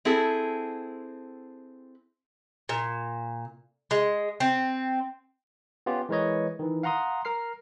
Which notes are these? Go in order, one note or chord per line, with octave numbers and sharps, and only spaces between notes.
C4 E4 G#4 A4
A#2
G#3
C4
B3 C#4 F4 G4
E3 G#3 A#4 B4 C#5 D#5
D#3 E3
F5 F#5 A#5 C6 D#6
A#4 F6 C7